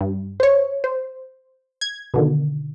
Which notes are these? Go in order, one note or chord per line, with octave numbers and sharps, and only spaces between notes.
G2
C5 C#5
C5
G#6
B2 D3 D#3